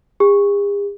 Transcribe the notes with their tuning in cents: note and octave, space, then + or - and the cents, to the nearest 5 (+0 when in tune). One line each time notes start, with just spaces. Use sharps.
G#4 -45